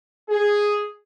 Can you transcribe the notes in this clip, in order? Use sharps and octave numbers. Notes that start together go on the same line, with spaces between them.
G#4